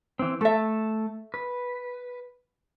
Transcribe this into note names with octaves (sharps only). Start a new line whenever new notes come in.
E3 C4
A3 A4 E5 A5
B4